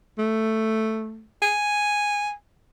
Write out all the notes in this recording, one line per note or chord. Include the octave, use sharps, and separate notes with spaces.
A3
G#5